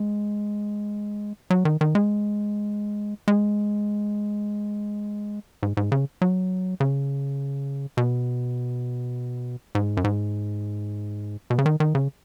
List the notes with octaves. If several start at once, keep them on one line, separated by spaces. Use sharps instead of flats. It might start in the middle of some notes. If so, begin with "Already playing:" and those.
Already playing: G#3
F#3
D#3
D#3
G#3
G#3
G#2
G#2
C#3
F#3
C#3
B2
G#2
F#2
G#2
B2
C#3
D#3
D#3
C#3